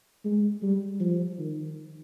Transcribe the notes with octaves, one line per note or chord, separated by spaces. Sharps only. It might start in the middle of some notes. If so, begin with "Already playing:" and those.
G#3
G3
F3
D#3